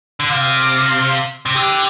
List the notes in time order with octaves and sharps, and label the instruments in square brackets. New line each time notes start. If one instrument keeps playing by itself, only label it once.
[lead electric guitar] D3
[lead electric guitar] C3 [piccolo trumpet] F5
[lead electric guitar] C3
[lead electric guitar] D3 [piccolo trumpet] G4